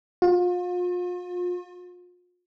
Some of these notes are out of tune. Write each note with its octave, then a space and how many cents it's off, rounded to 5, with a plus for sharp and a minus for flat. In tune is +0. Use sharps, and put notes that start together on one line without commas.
F4 +35